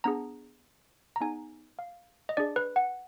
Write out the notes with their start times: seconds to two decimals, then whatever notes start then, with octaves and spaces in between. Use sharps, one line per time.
0.04 B3 D4 G#4 A#5
1.16 A#5
1.20 B3 D#4 G#4 G#5
1.79 F5
2.29 D#5
2.37 D4 G#4 D5
2.56 B4
2.76 F#5